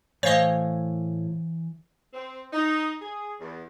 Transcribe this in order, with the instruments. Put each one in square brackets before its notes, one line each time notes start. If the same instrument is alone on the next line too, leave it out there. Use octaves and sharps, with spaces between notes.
[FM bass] A2 [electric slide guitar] E3 G#5 [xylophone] C5 F5 [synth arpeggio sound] C#5 D#5
[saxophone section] C4
D#4
G#4
E2